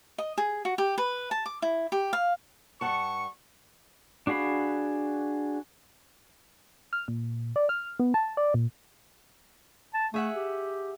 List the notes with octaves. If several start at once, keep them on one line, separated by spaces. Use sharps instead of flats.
D#5
G#4
F#4
G4
B4
A5
D6
E4
G4
F5
G2 F#5 A5 C#6
D4 F#4 G#4 F5 B5
F6
A#2
D5
F6
B3
A5
D5
A#2
A5
A3 G#4 E5 F#5
G4